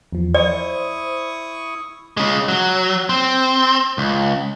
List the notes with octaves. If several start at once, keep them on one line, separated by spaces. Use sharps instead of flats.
E2 F3
E4 C5 D5 C#6 D#6
C#3 G#3
F#3
C4
C#2